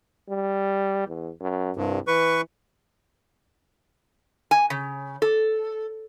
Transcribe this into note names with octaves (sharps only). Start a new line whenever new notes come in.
G3
E2
F#2
C2 G2
E3 B4 C#6
G#5
C#3
A4